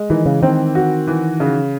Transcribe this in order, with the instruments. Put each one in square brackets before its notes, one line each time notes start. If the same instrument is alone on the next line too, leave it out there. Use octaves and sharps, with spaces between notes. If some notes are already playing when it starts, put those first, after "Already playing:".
Already playing: [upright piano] G#3
[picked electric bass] D#3 [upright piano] E3
[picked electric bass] C#3
[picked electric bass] D#3 [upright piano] C4
[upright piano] F#4
E3
C#3